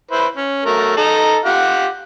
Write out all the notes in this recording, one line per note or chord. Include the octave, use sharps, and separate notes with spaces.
E4 B4 C5
C#4
F#3 A3 A#4
D#4 A4 A#5
F4 G4 F#5